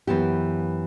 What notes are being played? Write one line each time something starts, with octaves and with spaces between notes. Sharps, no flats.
F#2 E3 B3 E4 G4